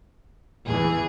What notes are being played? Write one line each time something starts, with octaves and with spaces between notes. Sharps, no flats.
E2 E3 G#4